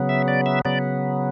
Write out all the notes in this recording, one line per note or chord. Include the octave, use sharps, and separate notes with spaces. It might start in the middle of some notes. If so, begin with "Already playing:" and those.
Already playing: C#3 F#3 B3
E5
D5
E5
C#3 F#3 B3 D5